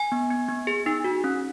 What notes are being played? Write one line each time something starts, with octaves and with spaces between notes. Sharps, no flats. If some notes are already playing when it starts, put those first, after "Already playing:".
Already playing: G#5
B3
B3
B3
G#4
D#4
F#4
C#4